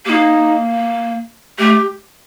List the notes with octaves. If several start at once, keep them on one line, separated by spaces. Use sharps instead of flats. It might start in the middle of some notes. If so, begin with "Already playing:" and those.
A#3 D#4 G4
A3 G4